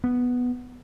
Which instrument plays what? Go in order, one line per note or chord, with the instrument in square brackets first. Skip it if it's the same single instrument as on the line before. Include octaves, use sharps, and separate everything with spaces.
[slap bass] B3